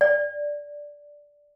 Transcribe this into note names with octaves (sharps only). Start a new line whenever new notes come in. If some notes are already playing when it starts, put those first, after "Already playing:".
D5